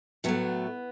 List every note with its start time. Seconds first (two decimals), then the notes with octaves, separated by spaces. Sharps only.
0.24 A2 F#3 A3 B3